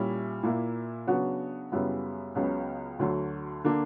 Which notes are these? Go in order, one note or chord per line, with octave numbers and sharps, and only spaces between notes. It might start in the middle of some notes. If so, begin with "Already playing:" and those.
Already playing: A#2 G3 C#4 E4
A#2 A#3 E4
C#3 F#3 B3 D4 F#4
F#2 C#3 G3 B3 E4
C#2 C#3 F#3 B3
D2 D3 F#3
D3 A#3 D4